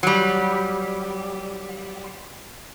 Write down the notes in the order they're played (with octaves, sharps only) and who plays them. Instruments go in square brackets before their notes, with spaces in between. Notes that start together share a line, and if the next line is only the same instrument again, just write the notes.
[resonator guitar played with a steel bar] F#3 G3